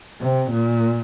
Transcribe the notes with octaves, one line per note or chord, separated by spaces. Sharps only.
C3
A#2